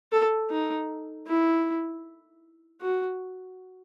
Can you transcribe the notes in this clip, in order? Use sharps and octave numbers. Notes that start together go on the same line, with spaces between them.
A4
D#4
E4
F#4